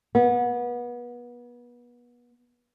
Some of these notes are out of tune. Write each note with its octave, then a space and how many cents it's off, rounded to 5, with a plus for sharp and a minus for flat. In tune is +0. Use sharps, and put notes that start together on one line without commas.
B3 -30